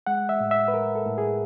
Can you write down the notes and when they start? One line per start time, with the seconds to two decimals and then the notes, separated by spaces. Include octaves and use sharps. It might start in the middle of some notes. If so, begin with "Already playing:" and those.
0.07 G#3 F#5
0.29 E5
0.40 A2
0.51 E5
0.68 B4
0.73 A2 A#4
0.95 A4
1.06 A2
1.18 G#4